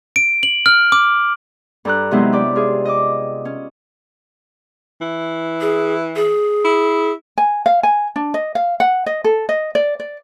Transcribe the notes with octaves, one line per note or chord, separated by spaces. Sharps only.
D7
F#7
F6
D6
G2 G4 A4 A#5 F#6
C3 F#3 G#3 B3 D#4 E4
G4 D5
F4 G#4
D#5 D6
C#4
E3
G#4
G#4
E4
G#5
F5
G#5
D4
D#5
F5
F#5
D#5
A4
D#5
D5
D5